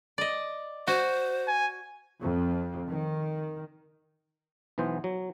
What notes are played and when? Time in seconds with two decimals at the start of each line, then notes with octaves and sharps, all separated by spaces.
0.18 D5 D#5
0.88 F#4 C5
1.48 G#5
2.21 F2
2.89 D#3
4.78 B1 E3 B3 C5
5.04 F#3